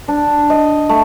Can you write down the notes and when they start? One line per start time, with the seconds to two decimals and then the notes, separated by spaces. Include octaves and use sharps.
0.08 D4
0.50 D#5
0.89 A3